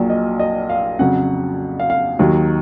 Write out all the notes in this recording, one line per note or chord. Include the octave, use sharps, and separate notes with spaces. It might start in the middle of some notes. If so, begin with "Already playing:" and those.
Already playing: A#1 A#2 F#3
D#5
D#5
F5
F2 C#3 F#3 F#5
F5
F5
D#2 D#3 F#3